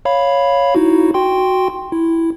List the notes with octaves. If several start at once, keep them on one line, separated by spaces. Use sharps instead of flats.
C#5 F5 B5
D#4 E4 F#4
F#4 G5 C6
E4